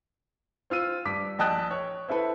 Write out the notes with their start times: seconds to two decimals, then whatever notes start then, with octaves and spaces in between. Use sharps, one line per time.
0.70 C4 F4 E6 D#7
1.05 G2 D6 B6
1.39 A#1 D#5 G5 A5 D#6 F#6
1.71 C#5
2.08 C4 E4 A4 B4